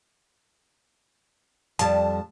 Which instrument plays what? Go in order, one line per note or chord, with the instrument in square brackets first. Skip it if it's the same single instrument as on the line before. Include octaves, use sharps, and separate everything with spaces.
[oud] F2 G3 [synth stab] A5